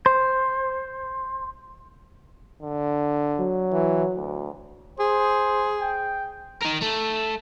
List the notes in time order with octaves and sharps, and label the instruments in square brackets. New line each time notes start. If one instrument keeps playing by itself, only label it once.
[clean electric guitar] C5
[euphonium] D3
[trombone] F#3
[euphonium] E3
D2
[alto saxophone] G#4 [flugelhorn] C5
[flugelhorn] G5
[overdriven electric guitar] D#4 A#4
A3